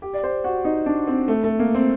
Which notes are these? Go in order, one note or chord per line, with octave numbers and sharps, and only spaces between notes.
G4
D5
C5
F#4
D#4
D4
C4
A3
A3
A#3
C4